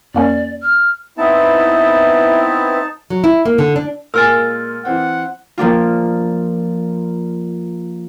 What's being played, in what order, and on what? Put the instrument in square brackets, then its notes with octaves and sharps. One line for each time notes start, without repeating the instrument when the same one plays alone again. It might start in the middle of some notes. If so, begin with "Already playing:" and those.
[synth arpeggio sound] F2 A#3 C#4 [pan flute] D5
[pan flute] F6
[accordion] B3 C4 E4 [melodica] D#4 A5 [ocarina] E5
[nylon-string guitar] F#3
E4
A#3
D3
D4
[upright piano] A#2 G#3 [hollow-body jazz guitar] A#4 G#5 [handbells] E6 F6 A6
[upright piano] E3 C4 [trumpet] F#5
[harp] F3 A#3 D4 F4